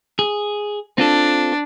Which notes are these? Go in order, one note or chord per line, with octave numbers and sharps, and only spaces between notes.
G#4
C4 D4 F4 A4